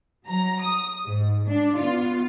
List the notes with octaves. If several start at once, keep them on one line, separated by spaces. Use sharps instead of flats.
F#3 A#5
D#6
G#2
D4
B3 F4